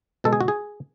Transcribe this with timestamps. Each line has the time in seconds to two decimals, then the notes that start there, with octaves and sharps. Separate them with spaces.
0.24 B2 G#3 A4
0.33 G#4
0.41 F#4
0.48 G#4